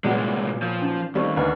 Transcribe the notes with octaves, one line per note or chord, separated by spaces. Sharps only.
C2 A#2 F#3 G#3 B3 D5 F#5
F3 A#4
C#4 D#4 G4
D#2 G3 A3 C4 D5 D#5 C#6
D2 G4 B4 B5